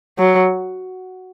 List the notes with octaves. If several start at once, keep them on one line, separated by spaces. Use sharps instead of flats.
F#3